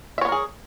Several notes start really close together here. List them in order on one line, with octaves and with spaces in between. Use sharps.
E5 C#5 B3 A#4 G#4